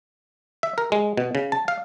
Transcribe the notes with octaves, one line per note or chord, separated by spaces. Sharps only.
E5
A#4
G#3
B2
C#3
A5
F5